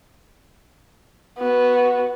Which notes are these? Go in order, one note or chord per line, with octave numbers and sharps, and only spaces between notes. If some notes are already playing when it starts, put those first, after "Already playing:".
B3 F#4